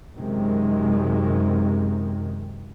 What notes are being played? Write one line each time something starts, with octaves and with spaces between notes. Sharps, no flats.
F#2 C3 D#3 G#3